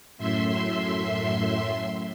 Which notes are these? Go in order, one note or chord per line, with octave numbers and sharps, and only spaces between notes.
F#2 A2 E5 C6